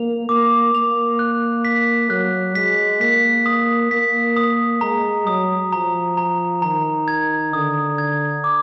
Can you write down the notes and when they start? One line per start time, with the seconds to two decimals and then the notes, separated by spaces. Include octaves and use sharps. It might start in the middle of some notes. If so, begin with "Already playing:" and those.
Already playing: A#3 F7
0.29 A#3 D6
0.74 A#3 F7
1.19 F#6
1.65 B6
2.10 F#3 F#6
2.55 G#3 B6
3.01 A#3 B6
3.46 D#6
3.91 A#3 B6
4.36 D#6
4.81 G#3 A#5
5.27 F#3 D#6
5.72 F3 A#5
6.17 A#5
6.62 D#3 A#5
7.08 G#6
7.53 D3 D#6
7.98 G#6
8.44 D6